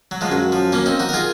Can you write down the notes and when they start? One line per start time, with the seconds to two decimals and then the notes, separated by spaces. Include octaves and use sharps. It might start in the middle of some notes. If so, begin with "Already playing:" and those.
0.11 F#3
0.21 F3 G#3
0.31 F#2 F#3
0.52 F3
0.72 A#3 C#4
0.86 C4 D#4
0.99 D#4 F#4
1.09 A#4
1.13 F4 G#4